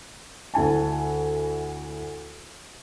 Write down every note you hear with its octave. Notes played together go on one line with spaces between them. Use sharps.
D2 E4 G#5 A5